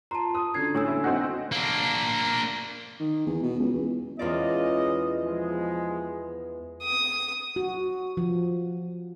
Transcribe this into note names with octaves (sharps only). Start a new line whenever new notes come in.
F4 A5 A#5 C6
D#6
D3 C#4 F#4 A4 G#6 C7
A2 C#5 G#5 E6
A#3 E4
C4 D#4 F#4
A#3 D4
D#3
E2
B2
C#2
E2
E2 G#3 C#4 F4 D5 D#5
B2 F3 G#3
D#6
F#4
F3